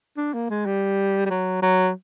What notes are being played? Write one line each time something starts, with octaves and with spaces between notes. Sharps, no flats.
D4
A#3
G#3
G3
G3
F#3
F#3